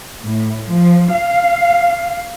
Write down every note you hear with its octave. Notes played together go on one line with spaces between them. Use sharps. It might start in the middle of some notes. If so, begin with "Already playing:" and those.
A2
F3
F5